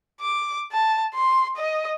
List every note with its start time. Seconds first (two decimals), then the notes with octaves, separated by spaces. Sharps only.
0.21 D6
0.72 A5
1.14 C6
1.56 D#5